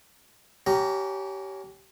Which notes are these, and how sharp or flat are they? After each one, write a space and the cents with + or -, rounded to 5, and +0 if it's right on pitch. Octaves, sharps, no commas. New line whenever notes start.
C#4 +10 G4 -20 A#5 +0